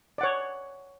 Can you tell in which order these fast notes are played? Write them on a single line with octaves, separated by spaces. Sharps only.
D5 F#5 C#5